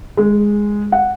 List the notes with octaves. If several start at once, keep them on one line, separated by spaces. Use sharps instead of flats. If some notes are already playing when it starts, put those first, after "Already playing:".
G#3
F#5